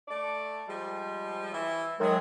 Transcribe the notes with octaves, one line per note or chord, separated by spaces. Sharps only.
A3 D5
F3 G3 G#3
E3 E5
D#3 F#3 G#3 G#4 E5